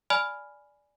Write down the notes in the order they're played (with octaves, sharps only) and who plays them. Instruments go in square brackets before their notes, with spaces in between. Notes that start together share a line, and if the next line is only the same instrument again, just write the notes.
[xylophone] D5 G#5 B5 F6